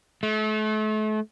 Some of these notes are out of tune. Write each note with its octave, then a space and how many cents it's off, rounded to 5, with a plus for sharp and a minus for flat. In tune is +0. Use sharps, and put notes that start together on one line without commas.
A3 -35